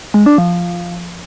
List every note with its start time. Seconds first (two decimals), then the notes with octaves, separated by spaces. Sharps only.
0.14 G#3
0.26 D4
0.38 F3